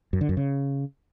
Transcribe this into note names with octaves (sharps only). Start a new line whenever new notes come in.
F#2
D3
F#2
C#3